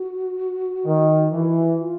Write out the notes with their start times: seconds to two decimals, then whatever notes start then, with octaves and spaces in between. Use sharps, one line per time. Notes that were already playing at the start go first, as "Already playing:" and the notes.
Already playing: F#4
0.86 D#3
1.33 E3
1.80 F4